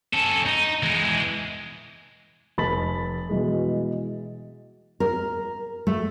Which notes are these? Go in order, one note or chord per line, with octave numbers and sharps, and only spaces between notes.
C#4 A4
D#4
E3 G#3
F1 B5 A6 B6 F#7
B2 E3 G#3
A#4
A3